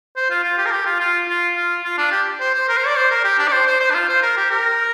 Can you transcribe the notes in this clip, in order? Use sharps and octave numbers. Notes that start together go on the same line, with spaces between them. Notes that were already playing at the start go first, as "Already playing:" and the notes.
C5
F4
F4
G4
A#4
G4
F4
F4
F4
F4
F4
D4
G4
C5
C5
A#4
C5
D5
C5
A#4
G4
D4
D5
C5
C5
C5
D4
F4
C5
A#4
G4
A#4